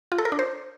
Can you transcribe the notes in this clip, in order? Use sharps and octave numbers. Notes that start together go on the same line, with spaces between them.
F4
A4
A#4
D4
C5